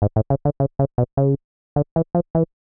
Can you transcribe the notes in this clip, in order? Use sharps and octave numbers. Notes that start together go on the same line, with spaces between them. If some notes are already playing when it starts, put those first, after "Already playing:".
G#2
A2
C#3
D3
C#3
C#3
B2
C#3
D3
E3
F3
E3